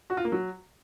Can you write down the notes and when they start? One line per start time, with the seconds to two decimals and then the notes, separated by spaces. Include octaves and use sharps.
0.10 F#4
0.17 F4
0.25 A#3
0.32 F#3